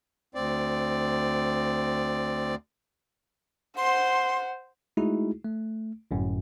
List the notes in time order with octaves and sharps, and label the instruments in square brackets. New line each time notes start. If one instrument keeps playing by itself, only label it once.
[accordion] D2 C4 D5
[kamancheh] C5 F#5 [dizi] C6
[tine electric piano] G#3 A3 D#4 E4 F#4 G#4
A3
G1 F#2 A2